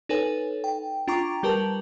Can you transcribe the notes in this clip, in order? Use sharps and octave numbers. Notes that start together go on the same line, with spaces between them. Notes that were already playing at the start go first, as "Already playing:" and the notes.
D#4 A4 B4 C#5 G#5
G5
D4 F4 G5 A#5 C#6 D6
G3 G4 A#4 B4 A5 F#7